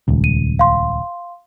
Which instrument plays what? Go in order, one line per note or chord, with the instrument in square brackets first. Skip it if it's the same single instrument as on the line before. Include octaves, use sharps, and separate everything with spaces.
[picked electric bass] D#1 C#2
[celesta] D#7
F5 C6